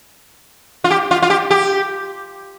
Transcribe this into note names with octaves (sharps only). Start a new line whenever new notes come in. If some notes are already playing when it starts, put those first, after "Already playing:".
F4
G4
F4
F4
G4
G4